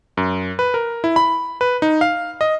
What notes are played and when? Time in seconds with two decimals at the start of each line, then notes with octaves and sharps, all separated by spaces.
0.17 F#2
0.59 B4
0.74 A#4
1.04 E4
1.16 B5
1.61 B4
1.82 D#4
2.01 F5
2.41 D#5